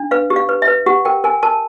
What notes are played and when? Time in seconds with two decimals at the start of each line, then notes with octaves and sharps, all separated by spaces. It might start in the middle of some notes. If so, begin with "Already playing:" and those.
Already playing: D4
0.11 B4 F5
0.30 G4
0.36 F5
0.49 B4
0.62 E5
0.68 B4
0.86 G4 F#5
1.05 A#4 G5
1.24 A#4 G#5
1.43 A#4 A5